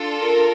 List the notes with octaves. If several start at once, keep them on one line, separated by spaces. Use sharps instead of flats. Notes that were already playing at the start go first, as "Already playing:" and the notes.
Already playing: D4 F4 A4
A#4